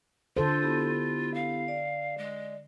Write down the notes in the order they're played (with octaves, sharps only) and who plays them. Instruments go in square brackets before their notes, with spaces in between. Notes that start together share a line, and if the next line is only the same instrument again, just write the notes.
[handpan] D3 A4 C5 [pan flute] F4
[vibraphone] B3 E4 G4
[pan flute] F5
[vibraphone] D5
[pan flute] G#3